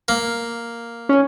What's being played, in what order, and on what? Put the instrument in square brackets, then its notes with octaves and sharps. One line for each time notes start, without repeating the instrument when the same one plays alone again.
[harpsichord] A#3
[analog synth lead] C#4